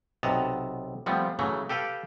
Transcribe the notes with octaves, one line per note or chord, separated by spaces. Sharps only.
B1 C3 B3 D#5 A5 A#5
F3 G3 A3 B3 C4
C#3 E3 F#3 A3
G4 A4 B4 F5 G5